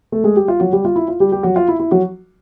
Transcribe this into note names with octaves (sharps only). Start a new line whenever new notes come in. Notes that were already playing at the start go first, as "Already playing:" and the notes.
A3 A4
G#3 G#4
G3 G4
F4
F#3 F#4
G3 G4
F4
E4
F4
G3 G4
G3 G4
F#3 F#4
F4
E4
E4
F#3 F#4